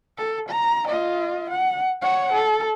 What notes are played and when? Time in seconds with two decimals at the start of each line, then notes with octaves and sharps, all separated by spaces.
0.18 A4
0.49 A#5
0.87 F4 D#5
1.50 F#5
2.02 C#5 F#5
2.33 A4